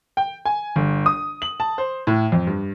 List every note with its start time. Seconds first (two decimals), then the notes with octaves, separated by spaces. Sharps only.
0.17 G5
0.45 G#5
0.76 G1
1.06 D#6
1.42 F#7
1.60 A5
1.78 C5
2.07 A2
2.32 F2
2.47 G2